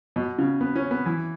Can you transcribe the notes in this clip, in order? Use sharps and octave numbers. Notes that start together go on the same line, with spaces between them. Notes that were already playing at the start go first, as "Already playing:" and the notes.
B2
C#3
B3
C#4
B3
E3